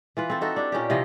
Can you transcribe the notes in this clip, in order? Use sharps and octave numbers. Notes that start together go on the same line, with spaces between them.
E3 F4 B4
C4 A4
D#4 F#4 A4 E5
D4 G4
A#2 C#4 D#4 G4
C3 E3 F3 D#5